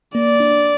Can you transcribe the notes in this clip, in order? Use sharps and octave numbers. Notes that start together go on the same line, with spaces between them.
A#3 D5
D4